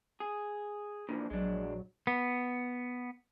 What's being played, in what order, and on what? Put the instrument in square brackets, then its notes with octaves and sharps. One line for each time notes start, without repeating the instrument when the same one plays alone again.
[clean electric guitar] G#4
[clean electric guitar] A#2 E3 F3 [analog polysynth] D4
[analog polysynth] A#1 F#3 [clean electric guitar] G#3 D4
[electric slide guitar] B3